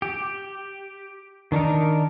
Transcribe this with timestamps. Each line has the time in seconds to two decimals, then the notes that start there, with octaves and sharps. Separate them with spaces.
0.02 G4
1.52 D#3 D4 D#4 A#4